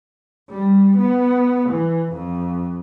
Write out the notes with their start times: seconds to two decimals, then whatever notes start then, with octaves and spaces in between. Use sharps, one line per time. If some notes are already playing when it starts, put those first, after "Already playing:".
0.50 G3
0.97 B3
1.69 E3
2.13 F2